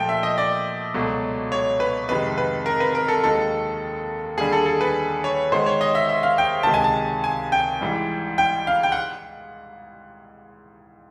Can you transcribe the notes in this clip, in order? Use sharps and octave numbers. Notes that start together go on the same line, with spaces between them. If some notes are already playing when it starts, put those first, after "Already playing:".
Already playing: A#2 F3 A3 G5
E5
D#5
D5
C#2 B2 F#3 A3
C#5
B4
F2 C3 D#3 G#3 B4
B4
A#4
B4
A#4
A4
D#2 D#3 G#3 A4
D#2 D3 G3 G#4
A4
A4
B4
C#5
G#2 D#3 G#3 C5
C#5
D#5
E5
E5
F5
G5
C#2 C3 D#3 G#3 A5
G#5
A5
G#5
G5
G#2 E3 G3
G5
F5
G5
F#5